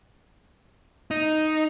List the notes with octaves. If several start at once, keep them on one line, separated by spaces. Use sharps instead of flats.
D#4